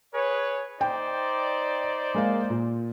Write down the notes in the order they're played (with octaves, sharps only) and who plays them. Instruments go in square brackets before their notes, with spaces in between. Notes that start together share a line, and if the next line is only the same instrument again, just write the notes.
[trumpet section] G#4 B4 C#5
[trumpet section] D#4 C5 D5 [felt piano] G5
[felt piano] G#3 A#3 F5
A#2